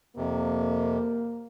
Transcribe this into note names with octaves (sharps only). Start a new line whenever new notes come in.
F2 C3 A#3